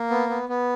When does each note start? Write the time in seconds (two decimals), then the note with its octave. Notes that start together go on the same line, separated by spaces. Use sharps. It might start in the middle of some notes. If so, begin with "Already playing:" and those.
Already playing: A#3
0.10 B3
0.30 B3
0.49 B3